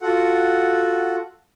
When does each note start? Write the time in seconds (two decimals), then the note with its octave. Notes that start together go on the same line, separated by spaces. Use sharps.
0.01 F4 F#4 A4 F#5